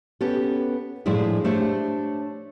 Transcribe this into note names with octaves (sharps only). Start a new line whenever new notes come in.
B3 C#4 G4 A4
A2 F3 G#3 D4 E4 G#4
A3 D4 G4 C5 C#5